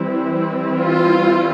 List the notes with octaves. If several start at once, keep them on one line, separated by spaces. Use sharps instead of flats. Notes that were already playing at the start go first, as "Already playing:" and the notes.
Already playing: E3 G3 C4 E4
F4